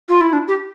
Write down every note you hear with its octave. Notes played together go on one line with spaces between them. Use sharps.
F4
E4
D4
G4